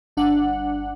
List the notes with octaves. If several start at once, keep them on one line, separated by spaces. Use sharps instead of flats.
G1 D4 F#5